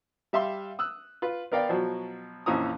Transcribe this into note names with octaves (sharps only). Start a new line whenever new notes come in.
G3 E5 F5 C6
D#6 E6 F#6
F4 B4
B3 A#4 D5 F5 G5
B2 F3 F#3
A#1 F2 E3 C#4 A#5 D#6